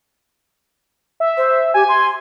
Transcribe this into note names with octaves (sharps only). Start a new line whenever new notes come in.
E5
C5
G4 G#5
C6